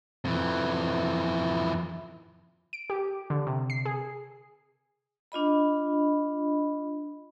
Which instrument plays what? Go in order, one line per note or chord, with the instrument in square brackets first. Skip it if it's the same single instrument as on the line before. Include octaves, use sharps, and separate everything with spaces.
[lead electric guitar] F2 E3
[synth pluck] D7
G4
D3
C3
C7
G#4
[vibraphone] D4 F4 D#5 B5